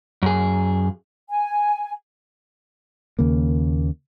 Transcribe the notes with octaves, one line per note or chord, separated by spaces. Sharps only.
F#2 G#4
G#5
D#2 C#3 A#3